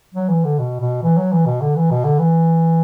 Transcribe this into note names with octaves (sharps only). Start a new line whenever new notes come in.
F#3
E3
D3
B2
B2
E3
F#3
E3
B2
D3
E3
B2
D3
E3